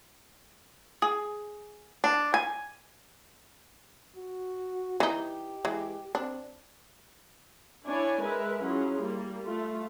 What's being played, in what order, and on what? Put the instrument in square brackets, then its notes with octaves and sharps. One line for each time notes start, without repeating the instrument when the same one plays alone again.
[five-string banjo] G#4
D4
G#5
[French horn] F#4
[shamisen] E3 D#4 [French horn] G4
[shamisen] E3 G#3
[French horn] C4 [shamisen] D4
[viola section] D4 E4 C#5 D5 G#5
G#3 A#4 B4 E5
F#3 C#4 E4 F4 G#4
G3 A#3
A3 F4